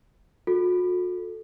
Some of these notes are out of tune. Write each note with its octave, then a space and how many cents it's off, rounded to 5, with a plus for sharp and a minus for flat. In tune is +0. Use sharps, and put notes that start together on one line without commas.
F#4 -45 A4 +0